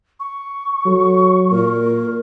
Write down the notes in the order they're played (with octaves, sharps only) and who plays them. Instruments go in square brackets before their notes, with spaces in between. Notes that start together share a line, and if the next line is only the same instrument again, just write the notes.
[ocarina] C#6
[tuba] F#3 [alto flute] A4
[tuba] A#2 [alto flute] A#4